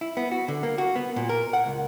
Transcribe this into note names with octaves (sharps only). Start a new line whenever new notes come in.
E4
B3
F#4
D3
A#3
F#4
B3
A#2
A#4
F#5
C#2